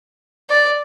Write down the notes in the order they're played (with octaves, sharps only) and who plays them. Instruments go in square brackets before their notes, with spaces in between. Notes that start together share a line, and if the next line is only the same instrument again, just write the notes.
[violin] D5